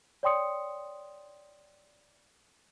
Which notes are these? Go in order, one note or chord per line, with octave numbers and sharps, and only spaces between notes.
C#5 D5 G5 C6 D#6 C#7